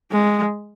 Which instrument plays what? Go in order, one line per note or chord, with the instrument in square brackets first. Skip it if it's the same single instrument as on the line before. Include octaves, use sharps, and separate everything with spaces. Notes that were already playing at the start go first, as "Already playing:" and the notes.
[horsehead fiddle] G#3